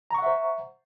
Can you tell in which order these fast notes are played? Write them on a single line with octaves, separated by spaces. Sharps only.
A#5 C#6 F#5 E5 C5